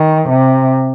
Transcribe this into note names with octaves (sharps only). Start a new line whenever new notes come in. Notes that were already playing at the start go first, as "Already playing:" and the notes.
Already playing: D#3
C3